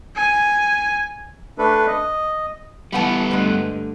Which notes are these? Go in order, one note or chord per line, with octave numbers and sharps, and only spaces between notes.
G#5
A3 D4 A4 B4
D#5
A2 E3 G3 B3 F#5 A5
G2 D3 G#3 A3 B4